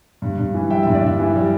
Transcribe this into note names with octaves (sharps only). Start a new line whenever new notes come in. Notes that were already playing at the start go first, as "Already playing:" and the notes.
G2
G2
E3
G3 E5 G5
G2 E5
D5
G2 E5
E3
G3